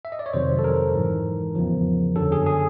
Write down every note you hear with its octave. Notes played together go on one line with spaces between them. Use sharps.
E5
D#5
D5
C#5
F2 C3 D#3 F#3 C5
A4
A#4
G#2 E3
E2 C#3 F3
F#2 D3 F#3 A4
G#4
G#4